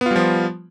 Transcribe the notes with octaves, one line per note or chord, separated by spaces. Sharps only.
F3 G3 B3 F4